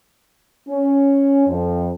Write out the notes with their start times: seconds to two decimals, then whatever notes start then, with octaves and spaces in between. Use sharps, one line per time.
0.69 C#4
1.47 F2